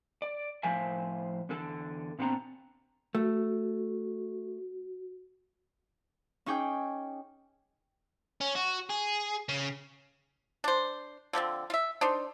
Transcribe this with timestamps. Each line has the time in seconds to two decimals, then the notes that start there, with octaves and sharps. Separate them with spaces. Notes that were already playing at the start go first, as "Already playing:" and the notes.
0.22 D5
0.63 A2 F3 C5 E5 F5 G#5
1.49 E2 D3 A4
2.19 A#2 B3 C4 D4 F#5 A#5
3.15 A3 F#4
6.46 C#4 D#4 G#4 G5 D6
8.41 C#4
8.56 F#4
8.90 G#4
9.49 C#3
10.64 D4 C5
11.33 D3 F3 B3 C4
11.70 F4 E5
12.01 D4 D#4 C5